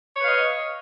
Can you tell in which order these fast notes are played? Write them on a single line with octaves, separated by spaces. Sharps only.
C#5 B4 F5 D#5